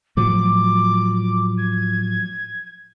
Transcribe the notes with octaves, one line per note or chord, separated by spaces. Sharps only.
A2 F3 F#3 D6
G#6